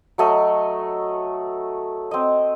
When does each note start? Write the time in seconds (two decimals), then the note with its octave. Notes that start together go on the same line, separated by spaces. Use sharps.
0.18 F#3 A3 D#5
2.11 C4 D#5